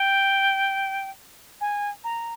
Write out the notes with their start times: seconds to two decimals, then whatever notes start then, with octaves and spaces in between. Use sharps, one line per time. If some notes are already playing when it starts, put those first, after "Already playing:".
Already playing: G5
1.61 G#5
2.04 A#5